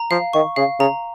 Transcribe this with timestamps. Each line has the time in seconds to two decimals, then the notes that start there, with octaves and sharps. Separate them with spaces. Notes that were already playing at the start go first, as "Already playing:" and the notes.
Already playing: A#5
0.11 F3 F5
0.33 D#3 C#6
0.56 C#3 F5
0.80 C#3 A#5